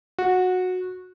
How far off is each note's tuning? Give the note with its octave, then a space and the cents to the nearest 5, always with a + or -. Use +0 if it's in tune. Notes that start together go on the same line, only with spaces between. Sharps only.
F#4 -15